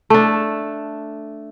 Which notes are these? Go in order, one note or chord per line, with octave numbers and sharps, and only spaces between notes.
A3 D4